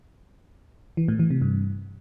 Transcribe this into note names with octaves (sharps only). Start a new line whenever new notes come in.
E3
A2
E3
C3
G2